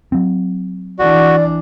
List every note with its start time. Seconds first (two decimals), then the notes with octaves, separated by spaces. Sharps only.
0.12 F#3 C4
0.99 E3 D4 F#4 D5